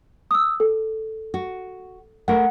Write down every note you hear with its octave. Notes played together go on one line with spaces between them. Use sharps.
D#6 E6
A4
F#4
A3 A#4 F#5